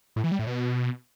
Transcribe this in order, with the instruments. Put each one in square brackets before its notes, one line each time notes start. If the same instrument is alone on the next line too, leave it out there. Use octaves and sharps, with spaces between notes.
[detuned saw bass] A2
E3
G3
A2
B2